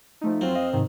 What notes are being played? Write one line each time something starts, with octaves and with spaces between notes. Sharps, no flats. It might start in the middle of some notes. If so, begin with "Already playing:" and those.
F3 A3 D#4
F2 F#3 C4 F4
D#5 F5
G#2 C3 D#3